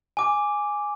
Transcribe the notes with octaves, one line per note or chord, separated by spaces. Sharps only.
G#5 D6